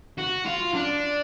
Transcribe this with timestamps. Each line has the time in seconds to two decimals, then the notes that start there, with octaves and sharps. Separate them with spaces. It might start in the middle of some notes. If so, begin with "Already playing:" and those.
0.18 F#4
0.46 F4
0.75 D4